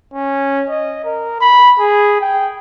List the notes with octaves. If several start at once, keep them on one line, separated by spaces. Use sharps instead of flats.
C#4
D#5
A#4
B5
G#4
G5